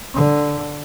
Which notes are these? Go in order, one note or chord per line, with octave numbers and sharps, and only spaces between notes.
D3